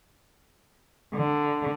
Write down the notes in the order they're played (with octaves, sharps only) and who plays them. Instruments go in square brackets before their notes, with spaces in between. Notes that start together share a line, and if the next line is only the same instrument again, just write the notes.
[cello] D3